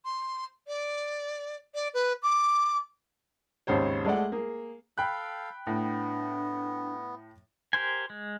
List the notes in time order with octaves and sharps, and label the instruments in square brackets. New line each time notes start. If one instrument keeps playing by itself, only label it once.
[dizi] C6
D5
D5
B4
D6
[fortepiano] G#1 D#2 C#3 C5 C#5
G#3 A3 D5 F#5
A#3 G#4
[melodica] A4 F5 [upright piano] G5 B5 F#6
[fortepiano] A2 [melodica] B3 [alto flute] D4
[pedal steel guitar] G4 A#4 C5 G#5
G#3